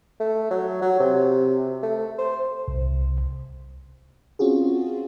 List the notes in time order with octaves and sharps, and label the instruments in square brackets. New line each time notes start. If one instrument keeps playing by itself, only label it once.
[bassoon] A3
F#3
F#3
C3
A3
C5
[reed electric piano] C2
[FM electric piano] C4 C#4 F4 F#4 G#4